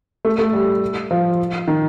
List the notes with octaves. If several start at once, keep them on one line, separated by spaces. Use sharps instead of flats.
A3
A3
G3
F3
D#3